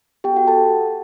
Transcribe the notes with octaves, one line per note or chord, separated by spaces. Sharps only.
B3 F#4 G4 A4 G5
F#4 F#5
A4 A5